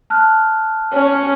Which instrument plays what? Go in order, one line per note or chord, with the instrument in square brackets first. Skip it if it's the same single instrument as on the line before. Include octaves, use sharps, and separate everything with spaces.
[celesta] A5 F6 F#6
[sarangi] C#4